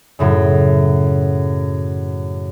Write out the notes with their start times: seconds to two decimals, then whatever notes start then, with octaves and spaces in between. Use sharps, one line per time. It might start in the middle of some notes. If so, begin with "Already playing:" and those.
0.19 F#2 A2 C#3